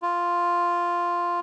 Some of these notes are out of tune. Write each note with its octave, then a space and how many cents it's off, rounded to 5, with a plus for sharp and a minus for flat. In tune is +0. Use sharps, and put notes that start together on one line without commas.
F4 +0